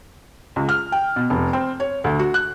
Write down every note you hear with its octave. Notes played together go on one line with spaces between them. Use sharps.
C#2
F6
G5
B2
F1
C4
C#5
D2
F#4
F#6